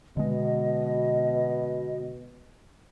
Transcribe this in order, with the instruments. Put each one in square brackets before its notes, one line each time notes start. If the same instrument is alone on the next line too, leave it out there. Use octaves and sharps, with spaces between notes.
[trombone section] B2 [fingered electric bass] D3 G#3 [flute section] D#5